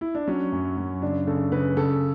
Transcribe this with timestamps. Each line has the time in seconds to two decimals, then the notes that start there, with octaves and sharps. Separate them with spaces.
0.01 E4
0.15 D4
0.27 F#3 C#4
0.52 F#2
0.77 F#2
1.02 C#3 D4
1.27 C#3 A4
1.52 C#3 B4
1.77 C#3 A4